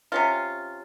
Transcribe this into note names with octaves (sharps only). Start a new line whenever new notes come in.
C3 C#4 F4